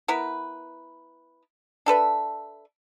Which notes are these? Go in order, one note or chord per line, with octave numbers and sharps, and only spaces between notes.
B3 E4 A#4 B4
D4 A4 B4 E5